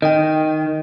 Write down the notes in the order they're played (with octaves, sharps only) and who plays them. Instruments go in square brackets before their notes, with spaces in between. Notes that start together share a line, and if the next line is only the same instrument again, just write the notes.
[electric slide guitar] D#3 [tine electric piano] D#5 G5